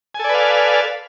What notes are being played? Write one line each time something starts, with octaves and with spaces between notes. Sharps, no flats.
A4 B4 D5 F5 G#5